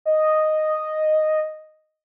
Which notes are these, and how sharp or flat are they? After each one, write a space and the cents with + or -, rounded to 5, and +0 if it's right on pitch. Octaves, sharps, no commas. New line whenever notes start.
D#5 -5